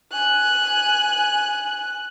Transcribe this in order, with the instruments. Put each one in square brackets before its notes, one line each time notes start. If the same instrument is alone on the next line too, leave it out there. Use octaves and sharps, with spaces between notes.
[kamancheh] G#5 F#6